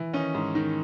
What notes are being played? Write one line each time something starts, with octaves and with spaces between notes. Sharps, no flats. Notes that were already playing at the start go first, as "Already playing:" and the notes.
Already playing: E3
D#3 C#4 D#4
G#2
D#3